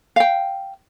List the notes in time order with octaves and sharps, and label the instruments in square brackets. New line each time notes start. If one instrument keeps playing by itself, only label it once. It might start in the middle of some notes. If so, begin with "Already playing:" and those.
[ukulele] F5 G5